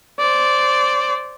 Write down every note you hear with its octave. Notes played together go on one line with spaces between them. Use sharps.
C5 D5